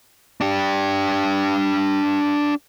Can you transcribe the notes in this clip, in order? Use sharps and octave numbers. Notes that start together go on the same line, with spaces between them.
D4 G4